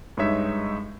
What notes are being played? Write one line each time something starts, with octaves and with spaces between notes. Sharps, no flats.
G2 G#3 D#4 C#5 E5